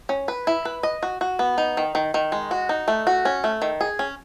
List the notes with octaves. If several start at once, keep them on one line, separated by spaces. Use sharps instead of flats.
C#4
B4
E4
B4
D#5
F#4
F#4
B3
D#4
D#3
D#3
D#3
G#3
F#4
D#4
A3
F#4
C#4
A3
D#3
G#4
C#4